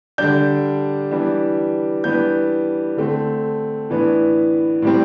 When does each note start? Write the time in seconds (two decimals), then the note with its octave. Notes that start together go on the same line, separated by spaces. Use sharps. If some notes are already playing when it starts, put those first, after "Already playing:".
0.18 D3 G3 D4 G6
1.11 E3 G3 B3 D4
2.04 E3 G3 B3 D4 G6
2.97 D3 A3 C4
3.90 A2 E3 B3 D4
4.82 A2 G3 C4